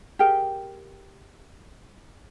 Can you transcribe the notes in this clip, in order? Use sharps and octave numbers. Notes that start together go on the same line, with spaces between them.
G4 G#4 A#4 G5